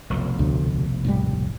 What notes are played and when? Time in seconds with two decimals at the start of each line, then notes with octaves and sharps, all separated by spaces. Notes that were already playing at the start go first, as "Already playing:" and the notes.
0.10 F1 B1
0.39 D2
1.05 D#1 A2 G3